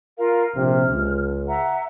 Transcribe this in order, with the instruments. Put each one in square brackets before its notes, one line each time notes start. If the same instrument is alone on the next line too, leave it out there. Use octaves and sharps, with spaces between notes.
[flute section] F4 A#4 F5
[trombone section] A#1 C3 [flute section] F6
[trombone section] C#2
[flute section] E5 F#5 A#5